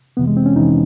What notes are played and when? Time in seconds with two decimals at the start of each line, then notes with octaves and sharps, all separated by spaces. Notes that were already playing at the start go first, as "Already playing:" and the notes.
0.17 F2 C3 E3 B3
0.27 G#3
0.37 C4
0.46 C#4
0.56 F2 C3 E3 D#4